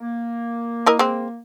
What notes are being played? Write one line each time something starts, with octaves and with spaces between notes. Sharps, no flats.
A#3
E4 A#4 D#5
G#3 C4